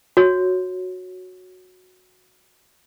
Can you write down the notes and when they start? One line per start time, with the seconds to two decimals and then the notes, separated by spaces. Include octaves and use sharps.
0.17 F#4 C#5